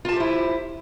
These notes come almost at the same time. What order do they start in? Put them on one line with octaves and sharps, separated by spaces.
F4 A5 G4 C5 E4